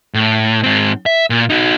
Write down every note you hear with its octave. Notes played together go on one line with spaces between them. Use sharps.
A2
G#2 C4
E5
A#2
D#4 F#4